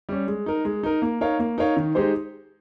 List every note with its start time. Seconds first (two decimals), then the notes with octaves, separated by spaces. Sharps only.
0.09 G3 C#4
0.28 G#3
0.46 D#4 A#4
0.65 G#3
0.83 D#4 A#4
1.02 A#3
1.21 D#4 A#4 C#5 F5
1.39 A#3
1.58 D#4 A#4 C#5 F5
1.77 D#3
1.95 G#3 D#4 G4 C5